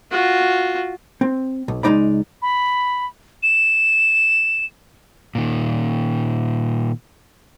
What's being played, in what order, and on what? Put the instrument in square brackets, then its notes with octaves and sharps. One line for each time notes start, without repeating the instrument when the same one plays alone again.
[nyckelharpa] F4 F#4
[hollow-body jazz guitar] C4
B1
C#2 D#3 G#3 D#4 D5 B5
[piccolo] B5
E7
[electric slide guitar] A#2 D#3